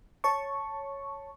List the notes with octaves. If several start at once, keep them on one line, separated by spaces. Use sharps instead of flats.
C#5 A5 C#6